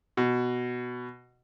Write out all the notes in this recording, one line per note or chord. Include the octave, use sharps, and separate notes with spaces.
B2